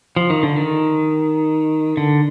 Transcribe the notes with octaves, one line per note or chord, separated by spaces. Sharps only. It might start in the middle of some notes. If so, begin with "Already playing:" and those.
F3
D#3
D3
D#3
D3